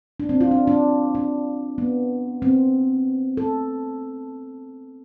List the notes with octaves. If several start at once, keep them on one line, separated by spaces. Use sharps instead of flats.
D4
C4
F4
D4
D4
D4
B3
C4
A4